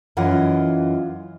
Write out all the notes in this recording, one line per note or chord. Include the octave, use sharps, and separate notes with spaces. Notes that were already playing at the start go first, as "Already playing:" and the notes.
F#2 E3 F4 D#5 F#5